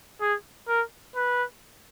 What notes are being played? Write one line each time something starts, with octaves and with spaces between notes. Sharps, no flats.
G#4
A#4
B4